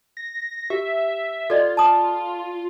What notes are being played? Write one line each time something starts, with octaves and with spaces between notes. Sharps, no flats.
A#6
G4 E5
F4 A4 D5 D#5
A5 D#6